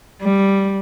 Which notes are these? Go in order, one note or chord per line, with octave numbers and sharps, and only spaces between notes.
G3